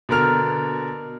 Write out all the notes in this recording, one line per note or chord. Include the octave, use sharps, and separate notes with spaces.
B2 D3 A#4 F6 F7